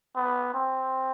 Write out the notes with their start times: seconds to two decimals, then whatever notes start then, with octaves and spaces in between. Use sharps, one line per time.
0.16 B3
0.54 C4